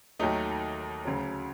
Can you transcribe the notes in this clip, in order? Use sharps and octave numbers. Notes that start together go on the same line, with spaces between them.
D#2 D#3 F#3 A3 D#4
D2 C#3 F#3